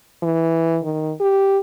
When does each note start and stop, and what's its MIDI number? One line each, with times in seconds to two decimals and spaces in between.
0.23 0.79 52
0.84 1.13 51
1.20 1.58 67